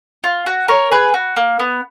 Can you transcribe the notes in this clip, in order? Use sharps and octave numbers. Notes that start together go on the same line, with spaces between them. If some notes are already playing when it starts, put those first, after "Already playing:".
F4
F#4
A#4 C#5
G#4 B4
F#4
A#3
B3